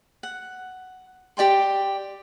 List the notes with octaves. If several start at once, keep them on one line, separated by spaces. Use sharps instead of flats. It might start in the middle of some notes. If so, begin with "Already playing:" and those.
F#5
G4 D5 G5 C6